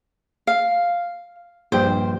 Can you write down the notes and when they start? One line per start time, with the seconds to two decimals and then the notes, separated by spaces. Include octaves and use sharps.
0.47 F5
1.72 A#1 G2 C5 G5